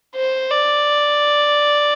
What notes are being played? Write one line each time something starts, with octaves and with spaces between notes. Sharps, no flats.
C5
D5